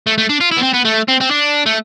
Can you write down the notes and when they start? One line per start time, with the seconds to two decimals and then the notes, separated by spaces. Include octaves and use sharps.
0.07 A3
0.18 A3
0.29 D4
0.40 F4
0.51 E4
0.57 B3
0.63 C4
0.74 B3
0.85 A3
1.09 C4
1.21 C4
1.31 D4
1.66 A3